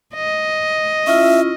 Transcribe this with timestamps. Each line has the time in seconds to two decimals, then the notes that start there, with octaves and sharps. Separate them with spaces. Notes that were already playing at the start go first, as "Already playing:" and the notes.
0.15 D#5
1.07 C#4 E4 F4 E5